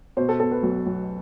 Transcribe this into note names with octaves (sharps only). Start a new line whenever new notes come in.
B2 C5
A4
B3 A4
B4
B1
B1